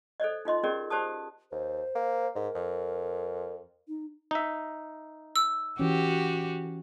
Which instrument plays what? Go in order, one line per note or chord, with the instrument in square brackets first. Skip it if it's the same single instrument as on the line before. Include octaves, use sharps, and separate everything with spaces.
[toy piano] A4 C5 D5 D#5
D#4 F4 D#5 C6
C#4 G4 G#4 A#4 D5 D#5
G4 C5 D5 A5 D#6
[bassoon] D#2 [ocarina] C5
[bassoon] A#3
[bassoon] G#2 [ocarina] A#4
[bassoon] F2
[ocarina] D#4
[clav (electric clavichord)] D#4 E5
[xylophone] E6
[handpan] E3 C#4 [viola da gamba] F#4 G4